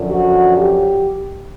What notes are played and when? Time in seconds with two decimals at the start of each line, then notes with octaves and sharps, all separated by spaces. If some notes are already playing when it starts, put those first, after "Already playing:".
Already playing: F#2 D3 F3
0.09 F#4
0.56 G4